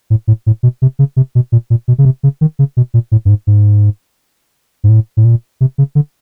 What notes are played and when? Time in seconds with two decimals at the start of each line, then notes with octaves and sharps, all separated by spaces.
0.10 A2
0.27 A2
0.46 A2
0.63 B2
0.82 C3
0.99 C#3
1.16 C3
1.35 B2
1.52 A#2
1.70 A#2
1.88 B2
1.98 C#3
2.05 C3
2.23 C#3
2.41 D#3
2.59 C#3
2.77 B2
2.94 A#2
3.12 A2
3.25 G2
3.29 G#2
3.47 G#2
4.84 G#2
4.89 A2
5.17 A2
5.25 A#2
5.61 C3
5.78 C#3
5.95 D3